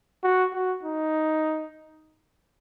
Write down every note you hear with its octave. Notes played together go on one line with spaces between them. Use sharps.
F#4
F#4
D#4